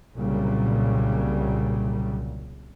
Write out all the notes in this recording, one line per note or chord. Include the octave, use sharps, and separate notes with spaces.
C2 A#2 C#3 F#3 G3